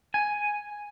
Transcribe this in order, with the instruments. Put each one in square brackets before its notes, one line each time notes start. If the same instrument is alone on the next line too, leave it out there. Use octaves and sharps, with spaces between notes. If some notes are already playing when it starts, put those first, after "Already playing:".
[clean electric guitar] G#5